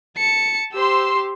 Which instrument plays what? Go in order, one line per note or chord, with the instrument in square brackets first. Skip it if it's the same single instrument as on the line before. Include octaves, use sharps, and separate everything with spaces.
[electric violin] A5 C#7
[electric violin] G4 [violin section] C5 C6 E6